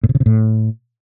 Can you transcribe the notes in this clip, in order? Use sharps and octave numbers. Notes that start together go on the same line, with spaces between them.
A2
C3
C#3
C3
A2